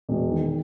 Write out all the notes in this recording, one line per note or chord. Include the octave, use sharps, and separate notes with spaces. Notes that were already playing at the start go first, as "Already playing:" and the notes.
E1
D#3